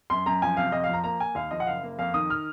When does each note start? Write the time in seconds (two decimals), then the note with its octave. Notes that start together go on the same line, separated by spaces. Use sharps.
0.10 F#2 C6
0.26 F#2 A#5
0.42 F3 G#5
0.57 C3 F5
0.72 F2 D#5
0.84 F5
0.89 F3 A#5
1.04 A#3 A#5
1.19 A#3 G#5
1.35 D#2 F5
1.51 F3 D#5
1.60 F#5
1.67 F#1 F5
1.83 A#3
1.99 F2 F5
2.14 D#3 D#6
2.30 F6